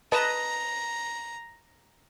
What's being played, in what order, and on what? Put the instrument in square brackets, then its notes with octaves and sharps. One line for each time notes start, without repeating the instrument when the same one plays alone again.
[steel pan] B4 D#5 A5 [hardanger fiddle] A#5